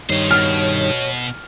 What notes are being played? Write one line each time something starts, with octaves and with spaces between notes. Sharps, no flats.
G2 D#3 C5 C#5 D#5
B2 F6